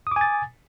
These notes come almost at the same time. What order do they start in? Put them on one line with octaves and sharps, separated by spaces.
D#6 D6 G#5 A6